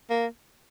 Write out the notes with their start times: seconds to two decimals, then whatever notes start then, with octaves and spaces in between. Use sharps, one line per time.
0.10 A#3